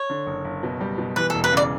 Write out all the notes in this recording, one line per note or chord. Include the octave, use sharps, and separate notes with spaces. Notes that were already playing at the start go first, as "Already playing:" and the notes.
Already playing: C#5
D3
F#1
F#1
B2
G3
B2
E3 B4
E1 A4
B4
C#3 D5